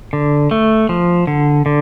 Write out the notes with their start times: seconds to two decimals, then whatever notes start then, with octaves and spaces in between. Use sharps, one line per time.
0.13 D3
0.51 A3
0.89 F3
1.27 D3
1.66 D3